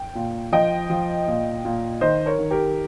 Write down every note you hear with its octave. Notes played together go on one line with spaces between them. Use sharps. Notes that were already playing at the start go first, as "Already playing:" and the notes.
Already playing: G5
A#2
F3 D#5 G5
F3
A#2
A#2
D#3 C5 D#5
A#4 C#5
D#3
G4 A#4